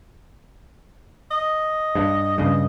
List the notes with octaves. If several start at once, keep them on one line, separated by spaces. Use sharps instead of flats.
D#5
G2
G2 C#3